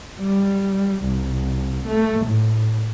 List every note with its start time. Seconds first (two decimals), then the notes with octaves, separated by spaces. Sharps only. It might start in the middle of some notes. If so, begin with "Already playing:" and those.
0.19 G3
1.04 C2
1.87 A3
2.26 A2